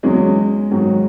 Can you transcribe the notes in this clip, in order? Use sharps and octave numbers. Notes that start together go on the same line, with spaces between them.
E2 C#3 F#3 G#3
G#2 D#3 F#3